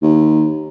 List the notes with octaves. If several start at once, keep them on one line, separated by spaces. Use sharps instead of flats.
D#2